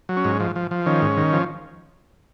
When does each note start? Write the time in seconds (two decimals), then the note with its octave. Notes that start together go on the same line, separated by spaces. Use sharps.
0.09 F#3
0.17 C#4
0.25 G#2
0.40 F3
0.56 F3
0.71 F3
0.86 D#3 C#4
1.02 G#2
1.17 D#3
1.33 F3